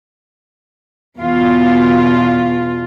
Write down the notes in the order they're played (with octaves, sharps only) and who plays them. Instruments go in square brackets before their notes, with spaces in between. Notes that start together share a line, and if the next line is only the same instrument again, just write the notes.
[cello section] E2 B2 F4